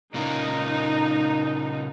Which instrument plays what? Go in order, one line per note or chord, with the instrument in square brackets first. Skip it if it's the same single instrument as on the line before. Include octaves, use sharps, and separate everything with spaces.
[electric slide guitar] A#2 C#3 A#3 [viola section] D#4